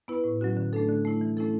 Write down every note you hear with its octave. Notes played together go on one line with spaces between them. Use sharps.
B3 E4 B4
A2
F#3 C#4 F#4
D3
A3 D4 A4
D3
A3 E4
E3
A3 C#4 E4 A4